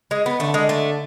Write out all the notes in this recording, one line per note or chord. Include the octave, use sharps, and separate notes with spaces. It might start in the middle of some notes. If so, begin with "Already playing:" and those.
G#3
B3
D3 A3
G#3
A3